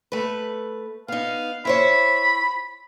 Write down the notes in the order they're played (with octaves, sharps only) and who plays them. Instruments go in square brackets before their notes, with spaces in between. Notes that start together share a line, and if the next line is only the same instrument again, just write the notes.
[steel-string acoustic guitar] A3 B4
[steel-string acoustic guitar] B3 D#4 [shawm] F5
[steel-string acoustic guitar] E4 C5 C#5 [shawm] B5